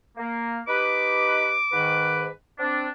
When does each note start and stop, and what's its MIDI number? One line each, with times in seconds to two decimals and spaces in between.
0.17 0.59 58
0.68 1.54 63
0.68 1.54 67
0.68 1.54 71
0.68 2.27 86
1.73 2.27 44
1.73 2.27 51
1.73 2.27 71
2.59 2.87 60
2.59 2.87 62